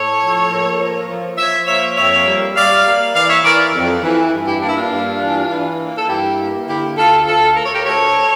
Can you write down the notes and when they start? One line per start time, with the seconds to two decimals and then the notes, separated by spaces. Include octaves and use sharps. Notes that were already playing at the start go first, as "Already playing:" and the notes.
Already playing: A2 A4 C#5
0.20 F3
0.50 A#3
0.79 F3
1.09 F3
1.37 F3 C#5 E5
1.67 A#3 C#5 E5
1.96 F2 C#5 E5
2.26 G3
2.55 G3 D5 F5
2.86 A#3
3.15 E3 D5 F5
3.29 C#5 E5
3.44 E3 A#4 D5
3.74 F2
4.03 E3
4.33 G2
4.47 E4 G4
4.61 A#3 D4
4.69 E4
4.76 D4 F4
4.91 G2
5.20 E3
5.50 E3
5.80 A#3
5.98 A4
6.09 G2 E4 G4
6.39 A#3
6.68 D3 E4 G4
6.97 D2 F4 A4
7.27 D2 F4 A4
7.56 A3 A#4
7.65 C#5
7.74 G4 A#4
7.86 D2 A4 C#5